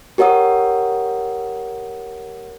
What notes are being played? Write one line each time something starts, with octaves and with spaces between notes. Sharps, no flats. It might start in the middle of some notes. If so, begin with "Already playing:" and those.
G4 A#4 C#5 F#5 D#6